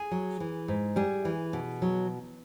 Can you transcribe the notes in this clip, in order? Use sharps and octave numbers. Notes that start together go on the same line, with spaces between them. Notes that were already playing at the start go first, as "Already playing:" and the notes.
Already playing: G#4
F#3
E3
G#2
G3 G#4
E3
B2
F#3